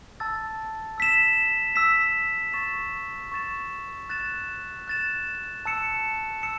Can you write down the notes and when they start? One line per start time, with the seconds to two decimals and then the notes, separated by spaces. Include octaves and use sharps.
0.20 A5 E6 A6
0.98 E6 B6 E7
1.75 E6 B6 E7
2.53 C#6 A6 E7
3.32 C#6 A6 E7
4.09 F#6 A6 E7
4.88 F#6 A6 E7
5.65 A5 E6 C#7 E7
6.43 E6 C#7 E7